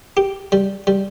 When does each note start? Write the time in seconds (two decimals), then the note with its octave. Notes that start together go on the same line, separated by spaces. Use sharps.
0.17 G4
0.52 G3
0.87 G3